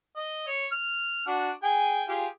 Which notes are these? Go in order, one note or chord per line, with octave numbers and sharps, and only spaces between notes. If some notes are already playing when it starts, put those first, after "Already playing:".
D#5
C#5
F6
D4 F#4
G#4 G5 G#5
F4 G4 G#4